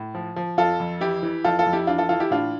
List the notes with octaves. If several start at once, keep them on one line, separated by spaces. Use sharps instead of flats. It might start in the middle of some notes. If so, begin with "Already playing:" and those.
Already playing: A2
F3
F3
F2 F4 A4
F2
E3 E4 G4
E3
F2 F4 A4
F4 A4
F2
E4 G4
E3 D4 F4
F4 A4
E3 F4 A4
E4 G4
A2 D4 F4